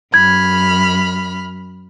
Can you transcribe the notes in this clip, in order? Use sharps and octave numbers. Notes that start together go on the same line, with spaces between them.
F#2 B5 F6 G#6